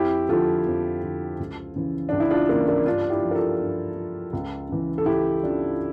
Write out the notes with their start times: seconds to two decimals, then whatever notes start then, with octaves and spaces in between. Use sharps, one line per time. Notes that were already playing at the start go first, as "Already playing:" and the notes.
Already playing: F2 E4 G4
0.29 D3 F3 F4 A4
0.66 F2
1.03 D3 F3
1.39 C#2
1.76 C#3 E3
2.09 C#2 D4
2.20 E4
2.31 D4 F4
2.49 C#3 E3 A#3
2.68 A#3 D4
2.86 G2 D4 F4
3.10 E4 G4
3.22 F3
3.31 A#4
3.35 F4 A4
3.59 G2
3.96 F3
4.33 C#2
4.69 C#3 E3
4.98 A4
5.06 C#2 E4 G4
5.43 C#3 E3 D4 F4